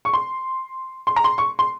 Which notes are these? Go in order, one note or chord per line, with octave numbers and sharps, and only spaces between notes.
C#6
C6
C6
A#5
C6
C#6
C6